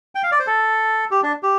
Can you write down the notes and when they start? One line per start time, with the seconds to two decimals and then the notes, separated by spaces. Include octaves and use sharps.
0.15 G5
0.23 F5
0.32 D5
0.39 C5
0.47 A4
1.11 G4
1.23 D4
1.43 G4